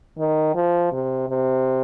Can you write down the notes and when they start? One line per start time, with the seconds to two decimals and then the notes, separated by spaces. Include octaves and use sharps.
0.19 D#3
0.55 F3
0.92 C3
1.30 C3